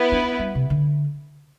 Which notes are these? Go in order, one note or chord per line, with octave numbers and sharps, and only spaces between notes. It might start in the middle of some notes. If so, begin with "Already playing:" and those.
Already playing: B3 E4 B4
D4
G3
C3
D3